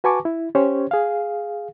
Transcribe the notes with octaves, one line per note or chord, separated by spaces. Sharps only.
F#4 B4 G#5 A5 C#6 D6
E4
C#4 G4 C5 C#5
G#4 F5